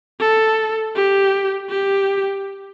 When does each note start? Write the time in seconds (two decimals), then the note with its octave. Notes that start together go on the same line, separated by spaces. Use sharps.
0.20 A4
0.95 G4
1.70 G4